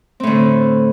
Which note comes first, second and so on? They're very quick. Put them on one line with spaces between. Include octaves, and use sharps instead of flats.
C4 A2 D3